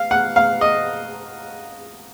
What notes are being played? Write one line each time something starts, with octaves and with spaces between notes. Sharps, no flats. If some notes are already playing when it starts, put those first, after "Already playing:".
Already playing: F5
F#5
F5
D#5